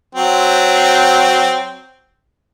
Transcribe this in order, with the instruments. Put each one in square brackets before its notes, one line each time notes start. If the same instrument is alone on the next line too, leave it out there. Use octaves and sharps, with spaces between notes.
[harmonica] F#3 C4